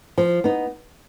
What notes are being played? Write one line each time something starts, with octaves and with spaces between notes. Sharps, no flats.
F3
B3 D#4